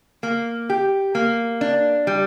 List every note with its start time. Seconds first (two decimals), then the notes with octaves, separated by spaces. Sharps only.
0.23 A#3
0.70 G4
1.15 A#3
1.61 D4
2.07 G3